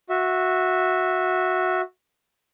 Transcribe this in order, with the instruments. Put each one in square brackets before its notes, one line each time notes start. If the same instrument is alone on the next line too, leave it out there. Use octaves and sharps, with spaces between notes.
[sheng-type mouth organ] F#4 E5